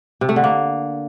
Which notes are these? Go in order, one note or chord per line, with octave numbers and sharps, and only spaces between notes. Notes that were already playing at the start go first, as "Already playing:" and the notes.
C3
A3
D3
A#3